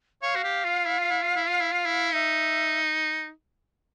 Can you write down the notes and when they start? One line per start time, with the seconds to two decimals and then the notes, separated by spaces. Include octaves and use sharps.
0.22 C#5 F5
0.36 F#4
0.44 G4
0.64 F4
0.85 E4
0.98 F4
1.11 E4
1.23 F4
1.36 E4
1.47 F4
1.61 E4
1.72 F4
1.85 E4
2.13 D#4 E5